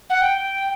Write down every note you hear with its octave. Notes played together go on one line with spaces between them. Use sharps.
F#5
G5